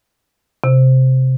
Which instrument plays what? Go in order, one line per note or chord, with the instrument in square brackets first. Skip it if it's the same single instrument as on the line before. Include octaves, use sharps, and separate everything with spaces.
[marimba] C3